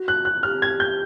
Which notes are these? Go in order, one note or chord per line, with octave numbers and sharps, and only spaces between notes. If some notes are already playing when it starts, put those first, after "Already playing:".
Already playing: F#4
F#6
F#6
G4 F6
G#6
G6